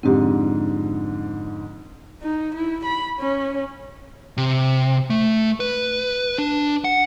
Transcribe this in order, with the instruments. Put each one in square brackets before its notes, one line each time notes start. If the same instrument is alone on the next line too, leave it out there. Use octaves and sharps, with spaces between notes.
[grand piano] F2 G#2 D3 [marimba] C4 G4
[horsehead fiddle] D#4
E4
B5
C#4
[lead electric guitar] C3
A3
B4
D4
F#5